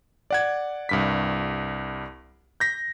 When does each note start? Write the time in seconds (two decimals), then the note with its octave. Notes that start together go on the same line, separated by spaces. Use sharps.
0.30 D5 F#5 G#6
0.89 C2 G2 B6
2.60 G6 A#6 B6